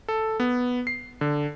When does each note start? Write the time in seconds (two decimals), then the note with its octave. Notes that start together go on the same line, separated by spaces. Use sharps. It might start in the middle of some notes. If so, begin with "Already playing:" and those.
0.08 A4
0.40 B3
0.87 C7
1.21 D3